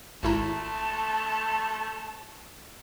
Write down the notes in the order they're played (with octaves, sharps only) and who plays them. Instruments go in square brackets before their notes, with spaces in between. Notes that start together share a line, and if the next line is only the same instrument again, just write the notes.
[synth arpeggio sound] G#1 E4 A#5 [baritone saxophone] A3 [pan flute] A5